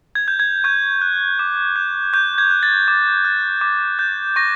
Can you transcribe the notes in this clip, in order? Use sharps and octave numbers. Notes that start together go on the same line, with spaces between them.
G#6
G6
G#6
C#6 G6
F#6
D6
G6
C#6 G6
G#6
F#6
A6
D6
F#6
D6
G6
C#6 A#6